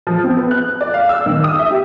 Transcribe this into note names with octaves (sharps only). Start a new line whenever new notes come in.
F3
C4
B3
F#6
D5
F5
E6
D#3
D#6
E5
G4